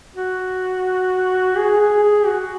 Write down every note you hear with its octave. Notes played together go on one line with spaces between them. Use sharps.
F#4
G#4
G#4
G#4
F#4